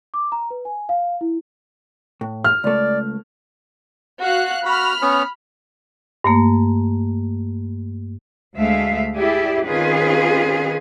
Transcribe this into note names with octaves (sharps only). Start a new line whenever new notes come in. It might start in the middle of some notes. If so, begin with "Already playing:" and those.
D6
A#5
B4
G#5
F5
E4
A2
F6
C#2 A3 D5
F#4 F5 F#6
F#4 B5 F6
B3 C#4
G2 A3 A#3
D2 G#3 A3 E5 F5
E4 G4 G#4 D5 E5
D#3 C4 C#4 F4 G#4 B4